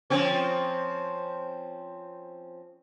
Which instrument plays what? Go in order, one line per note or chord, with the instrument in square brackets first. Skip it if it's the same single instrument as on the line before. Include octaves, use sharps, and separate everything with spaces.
[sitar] F3 C4 C#4